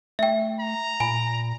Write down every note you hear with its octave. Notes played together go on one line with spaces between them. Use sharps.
A3 E5 G5
A#5
A#2 G#5 B5